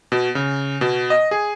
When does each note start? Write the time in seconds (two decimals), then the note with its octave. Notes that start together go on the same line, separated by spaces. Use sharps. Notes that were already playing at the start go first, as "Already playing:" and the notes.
0.12 B2
0.35 C#3
0.81 B2
1.10 D#5
1.31 G#4